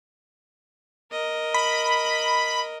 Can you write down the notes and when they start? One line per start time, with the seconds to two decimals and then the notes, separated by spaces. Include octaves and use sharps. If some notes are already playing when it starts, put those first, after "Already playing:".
1.12 A#4 D#5
1.54 B5